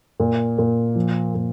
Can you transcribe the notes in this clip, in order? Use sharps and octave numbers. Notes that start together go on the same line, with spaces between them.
A#2
A#2
F3
A#2